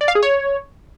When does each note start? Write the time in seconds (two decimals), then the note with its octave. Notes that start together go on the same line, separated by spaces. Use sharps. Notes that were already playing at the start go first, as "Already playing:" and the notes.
0.01 D5
0.08 F5
0.15 G#4
0.23 C#5